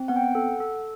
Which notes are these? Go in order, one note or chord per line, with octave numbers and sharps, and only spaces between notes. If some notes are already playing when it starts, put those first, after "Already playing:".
Already playing: C4
B3 F#5
G5
F#5
A4
A4